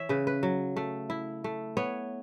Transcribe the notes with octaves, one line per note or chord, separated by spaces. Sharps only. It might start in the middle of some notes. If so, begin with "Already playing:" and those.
Already playing: E3 C#5 E5
C#3 B4
B4
F#3
A3
E4
A3
B3 C#5